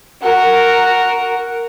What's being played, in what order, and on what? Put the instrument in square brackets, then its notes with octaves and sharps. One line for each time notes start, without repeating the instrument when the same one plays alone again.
[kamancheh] F#4 A#4